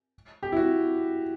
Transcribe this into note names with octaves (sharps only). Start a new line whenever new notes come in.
G4
E4
F#4